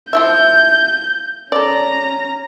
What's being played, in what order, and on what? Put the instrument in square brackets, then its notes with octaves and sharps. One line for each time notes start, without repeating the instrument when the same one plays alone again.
[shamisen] F3 E4 E5 [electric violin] G6
[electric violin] C#4 A#5 [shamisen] A4 D5